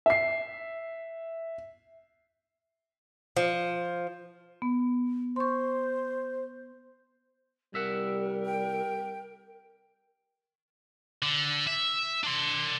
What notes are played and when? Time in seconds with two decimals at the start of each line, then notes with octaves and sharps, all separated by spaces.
0.06 E5 C7
3.36 F3
4.62 B3
5.36 C5 C6 C#6
7.74 C2 G3 A#4 E5 F#5
8.46 G5
11.22 D3
11.67 E5
12.24 D4 C6